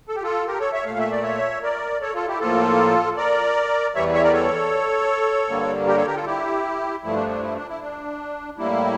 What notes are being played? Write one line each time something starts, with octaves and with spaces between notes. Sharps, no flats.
A4
G4
F4 A4
G4 A#4
A4 C#5
C#5 E5
A#2 A3 F5
E5
D5
C#5 E5
A#4 D5
A4 C#5
F4 A4
E4 G4
A2 F3 A#3 F4 A4
A#4 D5
E2 E3 G3 C#5 E5
C#5 E5
A#4 D5
A4 C#5
G2 D3 G3 A#3
G4 A#4
A4 C#5
G4 A#4
F4 A4
E4 G4
G2 F3 A3 E4
D4
D4
E4
D4
E4
D4
A2 G3 A#3 E4